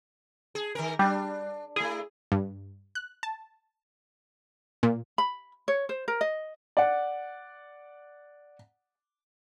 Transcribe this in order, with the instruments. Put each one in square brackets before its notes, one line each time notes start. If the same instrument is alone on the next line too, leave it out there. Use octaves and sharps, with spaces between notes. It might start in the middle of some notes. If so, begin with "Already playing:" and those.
[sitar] G#4
D#3 A#4
[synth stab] G3 [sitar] D4
[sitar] A3 E4 [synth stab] G#4
[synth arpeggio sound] G2
F#6
A5
A#2
[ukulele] B5
C#5
C5
A#4
D#5
[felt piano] D5 F#5